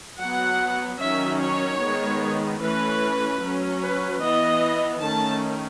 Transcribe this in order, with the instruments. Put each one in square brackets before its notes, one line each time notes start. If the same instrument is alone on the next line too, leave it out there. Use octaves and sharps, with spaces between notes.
[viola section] F#3 B3 F#5
D#3 F#3 C#4 E5
C#5
D#3 G#3 B3
E3 A3 C#4 B4
F#3 C#4
B4
E3 B3 D#5
D#3 A3 C#4 A5